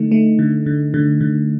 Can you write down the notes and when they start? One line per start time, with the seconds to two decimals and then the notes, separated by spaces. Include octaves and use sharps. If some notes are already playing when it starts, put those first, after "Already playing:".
Already playing: D3 A3 D#4
0.11 A3
0.39 D3
0.66 D3
0.94 D3
1.21 D3